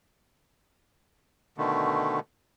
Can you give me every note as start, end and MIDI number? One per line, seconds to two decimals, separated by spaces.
1.58 2.20 47
1.58 2.20 50
1.58 2.20 51
1.58 2.20 57